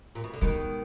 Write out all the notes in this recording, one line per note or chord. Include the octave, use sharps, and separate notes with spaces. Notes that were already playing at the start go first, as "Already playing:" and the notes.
A#2
B2
D3
B2 D#3 G#3